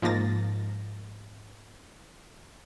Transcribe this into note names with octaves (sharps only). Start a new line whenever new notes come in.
G#2 F3 A#3 A6 A#6